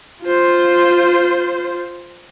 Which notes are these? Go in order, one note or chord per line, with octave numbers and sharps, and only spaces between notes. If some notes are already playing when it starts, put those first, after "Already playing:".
F4 C5